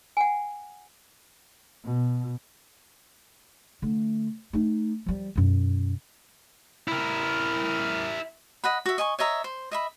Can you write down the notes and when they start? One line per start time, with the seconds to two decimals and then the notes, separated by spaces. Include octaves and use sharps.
0.17 F#5 G#5
1.85 B2
3.82 D3 A3
4.53 A3 D#4
5.06 F3 G3
5.36 F#2 B2
6.88 E4 A#4
8.64 D#5 F#5 B5
8.86 F#4 E5
8.98 D#5 G#5 C#6
9.19 C#5 D#5 E5 A#5
9.44 C5
9.71 D#5 E5 B5